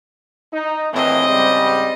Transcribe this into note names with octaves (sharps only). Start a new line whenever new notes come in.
D#4
A#1 A2 E3 C4 D#5
G#2 C#3 G3